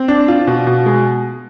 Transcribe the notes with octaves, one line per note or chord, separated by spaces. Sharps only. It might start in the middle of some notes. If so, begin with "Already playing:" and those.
Already playing: C4
D4
F4
B2
B2
G#3